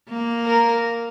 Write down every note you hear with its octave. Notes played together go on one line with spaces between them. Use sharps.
A#3
A#4